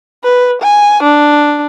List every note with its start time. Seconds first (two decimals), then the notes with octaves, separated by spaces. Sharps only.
0.24 B4
0.62 G#5
1.03 D4